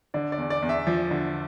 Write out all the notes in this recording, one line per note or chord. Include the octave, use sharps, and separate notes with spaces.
D3 D5
D5
E2
D5
E2
E5
F3
D3